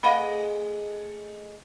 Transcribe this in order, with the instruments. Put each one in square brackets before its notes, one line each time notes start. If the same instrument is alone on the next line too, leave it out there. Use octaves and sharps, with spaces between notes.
[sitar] A3 G#4 D#5 [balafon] F5 F#5 B5